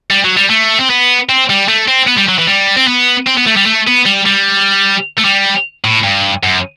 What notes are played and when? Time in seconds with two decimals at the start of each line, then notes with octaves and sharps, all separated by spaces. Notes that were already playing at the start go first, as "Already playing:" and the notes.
0.10 G3
0.24 F#3
0.37 G3
0.50 A3
0.79 C4
0.90 B3
1.29 C4
1.50 G3
1.69 A3
1.88 C4
2.08 B3
2.18 G3
2.29 F#3
2.39 E3
2.47 G3
2.76 C4
2.87 B3
3.27 C4
3.37 B3
3.46 A3
3.56 G3
3.66 A3
3.87 B3
4.05 G3
4.26 G3
5.18 A3
5.25 G3
5.84 A2
6.03 G2
6.44 F#2